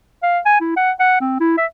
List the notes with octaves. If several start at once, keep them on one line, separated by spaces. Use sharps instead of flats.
F5
G#5
E4
F#5
F#5
C4
E4
E5